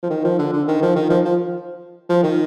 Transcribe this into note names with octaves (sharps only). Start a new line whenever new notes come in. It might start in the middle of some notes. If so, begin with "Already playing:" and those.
F3
D#3
F3
D3
D3
D#3
F3
D#3
F3
F3
F3
D#3